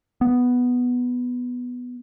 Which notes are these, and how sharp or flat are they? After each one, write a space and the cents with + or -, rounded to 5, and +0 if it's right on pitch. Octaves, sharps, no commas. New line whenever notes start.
B3 +0